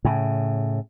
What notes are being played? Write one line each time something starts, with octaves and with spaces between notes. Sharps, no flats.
A2 C#3